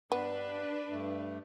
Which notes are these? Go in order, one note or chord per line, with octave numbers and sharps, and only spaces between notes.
G2 B3 D4 B4
G2 A3